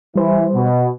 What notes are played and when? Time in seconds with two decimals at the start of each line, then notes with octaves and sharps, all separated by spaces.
0.16 E3 G3 C5
0.54 B2